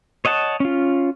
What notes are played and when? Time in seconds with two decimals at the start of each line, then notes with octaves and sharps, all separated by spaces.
0.25 C#5 D#5 F#5 A5
0.60 C#4 F4